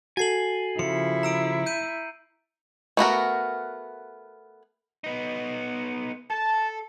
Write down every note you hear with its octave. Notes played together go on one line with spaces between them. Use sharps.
F#4 A4 G#5 A6 C7 F#7
C#3 F3 E4 C#7
A#5 E6 D7
G6 D#7
A3 B3 F#4 A#4
B3 D#4
A4 A5